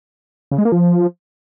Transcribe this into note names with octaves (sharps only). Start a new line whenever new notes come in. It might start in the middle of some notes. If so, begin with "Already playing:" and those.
C#3
G#3
A#3
F3